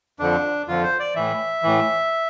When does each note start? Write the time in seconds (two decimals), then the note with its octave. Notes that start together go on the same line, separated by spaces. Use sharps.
0.19 F2 D3 F3 D4
0.67 F2 D3 F3 F4
0.83 C5
1.00 D5
1.16 A2 E3 E5
1.63 A2 E3